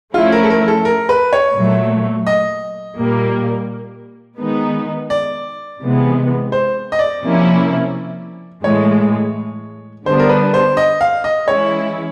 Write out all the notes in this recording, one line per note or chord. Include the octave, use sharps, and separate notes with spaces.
F3 A3 C#4 E4 F4
A#4
A4
A#4
A4
A#4
B4
C#5
A#2 F#3 A3
D#5
A#2 G3 A#3
D#3 G#3 B3 D#4
D5
C3 E3 G#3 B3
C5
D#5
D5
C3 F3 A#3 C#4 E4
A2 E3 G#3 C#5
D3 G3 B3 D4 C5
A#4
B4
C5
D#5
F5
D#5
E3 G#3 C#4 E4 C#5